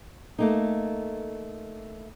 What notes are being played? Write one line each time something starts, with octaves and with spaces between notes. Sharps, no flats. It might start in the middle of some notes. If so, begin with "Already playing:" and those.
A3 A#3 D#4